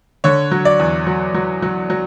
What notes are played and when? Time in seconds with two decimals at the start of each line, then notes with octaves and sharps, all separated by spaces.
0.24 D3 C#5
0.51 F#3
0.65 D5
0.79 E2
1.07 F#3
1.34 F#3
1.62 F#3
1.90 F#3